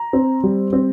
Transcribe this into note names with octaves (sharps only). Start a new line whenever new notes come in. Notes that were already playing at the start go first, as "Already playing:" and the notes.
Already playing: A#5
C4
G3
C4